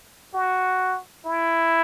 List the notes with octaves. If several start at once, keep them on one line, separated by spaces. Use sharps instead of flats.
F#4
E4